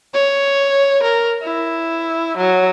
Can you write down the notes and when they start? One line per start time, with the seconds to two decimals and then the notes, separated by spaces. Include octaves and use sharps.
0.14 C#5
1.03 A#4
1.43 E4
2.38 F#3